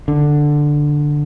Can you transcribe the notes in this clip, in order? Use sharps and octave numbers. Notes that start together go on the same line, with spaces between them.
D3